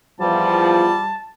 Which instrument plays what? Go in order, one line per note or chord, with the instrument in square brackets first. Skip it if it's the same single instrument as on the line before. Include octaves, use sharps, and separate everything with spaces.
[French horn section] E2 F3 [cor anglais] G3 [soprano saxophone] A5